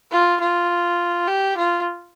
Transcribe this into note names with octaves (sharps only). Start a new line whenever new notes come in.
F4
F4
G4
F4